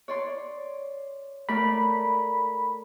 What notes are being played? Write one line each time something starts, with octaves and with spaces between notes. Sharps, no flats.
C#5 D5 C6
A3 A#4 D5 B5